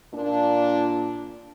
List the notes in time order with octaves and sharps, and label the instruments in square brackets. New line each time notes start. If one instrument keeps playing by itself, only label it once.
[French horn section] A#2 D4